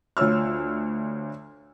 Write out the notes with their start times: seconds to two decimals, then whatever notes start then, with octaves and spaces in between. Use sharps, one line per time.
0.17 D2 F4 C#5 E6 F6